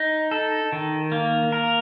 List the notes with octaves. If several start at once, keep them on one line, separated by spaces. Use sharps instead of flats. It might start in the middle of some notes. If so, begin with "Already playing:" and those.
Already playing: D#4
A4
D#3
A#3
A#4